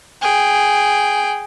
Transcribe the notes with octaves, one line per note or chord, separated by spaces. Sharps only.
G#4 G5